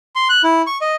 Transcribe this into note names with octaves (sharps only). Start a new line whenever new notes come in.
C6
F#6
E4
C#6
D#5